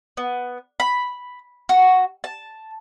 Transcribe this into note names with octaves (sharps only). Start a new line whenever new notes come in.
B3
B5
F#4
A5